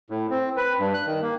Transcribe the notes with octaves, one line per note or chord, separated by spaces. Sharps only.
A2
C4
B4
G2
F#6
D#3
A#3